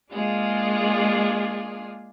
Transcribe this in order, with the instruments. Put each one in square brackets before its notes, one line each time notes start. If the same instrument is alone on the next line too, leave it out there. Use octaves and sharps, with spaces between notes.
[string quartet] G#3 A#3 D4 F4 G#4